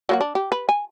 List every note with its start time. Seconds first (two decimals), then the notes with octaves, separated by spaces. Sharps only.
0.09 F#3 A#3 F#4
0.21 D4
0.35 G4
0.52 B4
0.69 G#5